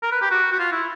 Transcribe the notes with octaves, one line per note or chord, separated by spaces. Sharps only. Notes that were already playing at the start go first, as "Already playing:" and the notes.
A#4
B4
G4
F#4
F#4
F4
E4